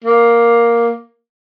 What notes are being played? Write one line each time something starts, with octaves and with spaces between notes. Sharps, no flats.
A#3